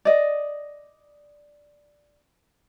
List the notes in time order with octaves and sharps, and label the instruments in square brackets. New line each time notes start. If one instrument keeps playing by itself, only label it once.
[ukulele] D5 D#5